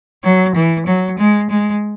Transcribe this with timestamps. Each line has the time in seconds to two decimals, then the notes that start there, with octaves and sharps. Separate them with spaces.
0.24 F#3
0.55 E3
0.86 F#3
1.18 G#3
1.50 G#3